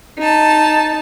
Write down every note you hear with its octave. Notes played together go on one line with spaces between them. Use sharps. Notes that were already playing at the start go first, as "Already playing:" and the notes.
D#4 A5